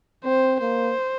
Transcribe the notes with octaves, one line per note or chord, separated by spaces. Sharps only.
C4 C5
A#3 C5